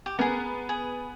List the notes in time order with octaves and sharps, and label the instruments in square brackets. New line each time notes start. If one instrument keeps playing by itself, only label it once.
[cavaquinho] G4
[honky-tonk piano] B3 [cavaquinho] G#4 A#4
[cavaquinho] G#4